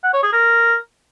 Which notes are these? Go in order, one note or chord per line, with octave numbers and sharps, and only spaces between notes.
F#5
C#5
G#4
A#4